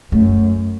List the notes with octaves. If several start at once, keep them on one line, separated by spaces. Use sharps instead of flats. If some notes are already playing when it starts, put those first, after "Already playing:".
F#2 A3